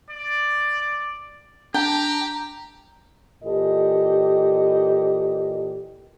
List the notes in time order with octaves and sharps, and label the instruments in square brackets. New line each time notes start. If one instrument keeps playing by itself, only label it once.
[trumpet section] D5
[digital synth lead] D4 [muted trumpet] G4 [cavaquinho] G5 [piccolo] A#5
[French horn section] A#2 E3 G4 A4 D#5